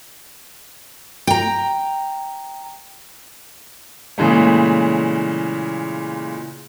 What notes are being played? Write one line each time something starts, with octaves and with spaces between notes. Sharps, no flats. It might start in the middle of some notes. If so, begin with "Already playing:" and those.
G5 A#5
A#2 C#3 E3 G#3 A3